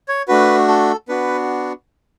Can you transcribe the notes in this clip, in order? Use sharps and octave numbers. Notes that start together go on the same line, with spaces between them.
C#5
A3 D4 F#4 B4
A4
B3 D4 F#4 B4